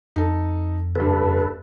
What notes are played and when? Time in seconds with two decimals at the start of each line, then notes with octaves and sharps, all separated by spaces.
0.16 F2 D#4 A4
0.95 F#1 G2 A4 B4